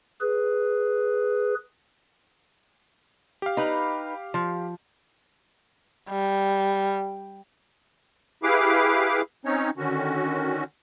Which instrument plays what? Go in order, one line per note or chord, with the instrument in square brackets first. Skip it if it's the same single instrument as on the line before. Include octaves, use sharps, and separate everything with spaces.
[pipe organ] G#4 B4
[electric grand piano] G4 F5
[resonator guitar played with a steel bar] D#4 B4
F3
[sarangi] G3
[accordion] E4 G4 G#4 B4 F5 D6
C4 C#4 D#4 C#5
D3 D#3 C#4 F#4